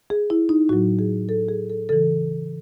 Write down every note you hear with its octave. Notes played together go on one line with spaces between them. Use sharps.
G#4
E4
D#4
A2 F#3 F#4
G#4
A4
G#4
A4
C#3 E3 A4